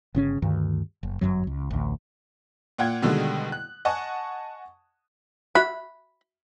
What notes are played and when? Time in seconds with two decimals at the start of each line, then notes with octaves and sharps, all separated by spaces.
0.15 G1 C#3 C#4
0.42 D2 G2 D#3
1.03 F#1
1.21 G1 C2 F#2 F#3
1.47 C#2
1.70 A1 D2
2.78 A#2 F4 F#5 G5 G#6
3.02 B2 D3 D#3 G3 G#3
3.52 F#6
3.85 D#5 F#5 G#5 A5 C#6
5.55 F#4 E5 B5 F#6